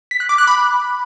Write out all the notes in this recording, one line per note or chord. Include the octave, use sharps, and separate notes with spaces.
B6
F#6
D6
F#6
B5